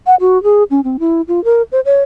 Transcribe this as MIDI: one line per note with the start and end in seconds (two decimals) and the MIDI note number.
0.06 0.15 78
0.20 0.41 66
0.43 0.63 68
0.71 0.81 61
0.84 0.97 60
1.00 1.22 64
1.28 1.43 65
1.44 1.62 70
1.72 1.80 72
1.85 2.02 73